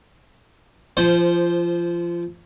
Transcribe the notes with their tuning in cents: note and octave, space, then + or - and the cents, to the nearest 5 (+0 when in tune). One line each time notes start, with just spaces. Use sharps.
F3 -25 C5 +0